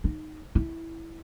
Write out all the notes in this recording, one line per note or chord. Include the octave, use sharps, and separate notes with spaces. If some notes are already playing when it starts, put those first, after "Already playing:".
D#4
E4